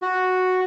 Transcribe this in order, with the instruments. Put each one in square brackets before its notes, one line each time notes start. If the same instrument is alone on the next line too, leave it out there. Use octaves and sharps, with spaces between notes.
[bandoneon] F#4